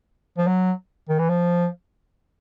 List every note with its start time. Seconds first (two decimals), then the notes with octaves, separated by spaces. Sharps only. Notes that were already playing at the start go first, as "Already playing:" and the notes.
0.38 F3
0.47 F#3
1.09 D#3
1.19 E3
1.29 F3